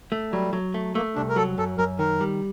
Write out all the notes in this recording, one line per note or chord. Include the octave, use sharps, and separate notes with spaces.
A3
F#3 G3
F#3
A3
A3 A#3
C2 D4
A#4
F#3 A4
F#2 A4
F#2 A#4
D#3 A#4
G3